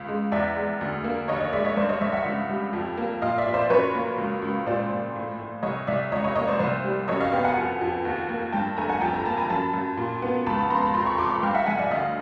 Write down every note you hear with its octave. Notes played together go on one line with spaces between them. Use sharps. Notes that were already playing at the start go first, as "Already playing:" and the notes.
Already playing: C#2
G#3
E2 D5 E5
G#3
D2
A#3
D#2 C#5 D#5
C#5 D#5
G#3 D5 E5
C#5 D#5
G2 C5 D5
C#5 D#5
G2 D5 E5
E5 F#5
C#2
G3
F2
A#3
A#2 D#5 F5
D5 E5
A#2
C5 D5
F#2 B4 C#5
A#3
C#2
C#2
A#2 C5 D5
A#2
A2
A2
C2 C#5 D#5
C2 D5 E5
C#2 C#5 D#5
C#5 D#5
A#3 C#5 D#5
C5 D5
C2 C5 D5
G3
F#2 C#5 D#5
D#5 F5
B3 F5 G5
F#5 G#5
F2
F2
D#2
A#3
G2 G5 A5
A3 G#5 A#5
F#5 G#5
F2 G5 A5
G#5 A#5
A#3 A5 B5
G#5 A#5
F#2 A5 B5
F#2
A#2
B3
C#2 A5 B5
A5 B5
B3 A#5 C6
A5 B5
F2 A#5 C6
B5 C#6
F2 C6 D6
B5 C#6
G2 F5 G5
E5 F#5
G2 F#5 G#5
D5 E5
D2 D#5 F5